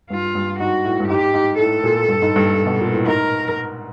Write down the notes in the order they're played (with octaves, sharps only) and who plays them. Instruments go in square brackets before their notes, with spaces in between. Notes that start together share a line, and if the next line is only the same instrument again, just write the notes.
[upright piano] G2 [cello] F4
[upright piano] G2
[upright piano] G#2 [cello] F#4
[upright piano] A2
G2
[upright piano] G#2 [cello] G4
[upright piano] G#2
[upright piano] A2 [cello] A4
[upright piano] A#2
G2
G#2
G2
B2
A#2
A2
[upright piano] G#2 [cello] A#4